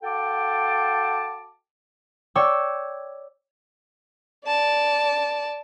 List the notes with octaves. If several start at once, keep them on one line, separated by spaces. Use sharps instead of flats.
F#4 A4 F5 G5 A5 D6
C#5 D5 G5 E6
D5 A5